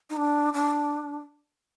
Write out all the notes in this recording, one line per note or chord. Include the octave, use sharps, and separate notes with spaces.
D#4
D4
D4